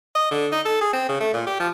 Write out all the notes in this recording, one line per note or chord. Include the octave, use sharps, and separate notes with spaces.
D#5
D3
D#4
A4
G#4
C4
C#3
A3
A#2
G4
F3